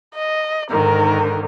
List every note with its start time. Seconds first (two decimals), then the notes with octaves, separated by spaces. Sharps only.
0.15 D#5
0.71 G#2 D3 D#3 A#4